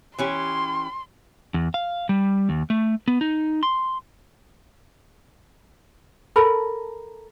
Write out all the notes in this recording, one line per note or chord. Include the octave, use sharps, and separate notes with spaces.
E3 C#4 G4 C6
E2
F5
G3
D#2
A3
B3
D#4
C6
A4 A#4 B5